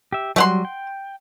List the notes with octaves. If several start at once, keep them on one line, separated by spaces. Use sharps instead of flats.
G4 E5
F#3 G3 A3 F#5 C6
G5